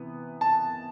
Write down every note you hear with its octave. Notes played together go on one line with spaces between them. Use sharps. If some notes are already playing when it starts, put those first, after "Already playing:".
Already playing: C3 E3 B3
A5